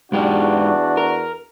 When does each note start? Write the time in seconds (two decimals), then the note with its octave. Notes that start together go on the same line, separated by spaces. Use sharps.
0.12 E2 G#2 G#3 D4 F#4 G4
0.97 A#4